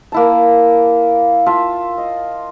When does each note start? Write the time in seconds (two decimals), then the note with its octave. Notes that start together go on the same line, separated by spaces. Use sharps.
0.12 A#3 E4 A5
1.46 F4 E5 A5
1.98 D#5